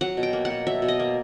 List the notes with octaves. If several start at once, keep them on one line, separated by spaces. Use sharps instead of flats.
F#3 F#5
B2
G5
A#3
F#5
B2
F#3 E5
B2
D#5
A#3